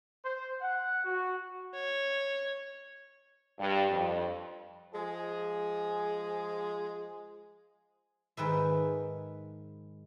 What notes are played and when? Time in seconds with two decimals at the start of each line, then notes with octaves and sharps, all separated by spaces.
0.24 C5
0.61 F#5
1.04 F#4
1.74 C#5
3.59 G2
3.90 F2
4.94 F3 G#3 G#4
8.37 G#2 D#3 B4 E5